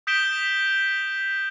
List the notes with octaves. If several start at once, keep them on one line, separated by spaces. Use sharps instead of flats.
D#6 G6 B6 D7 E7 G7